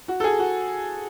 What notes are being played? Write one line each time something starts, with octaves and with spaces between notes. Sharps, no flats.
F#4
A4
G#4
F#4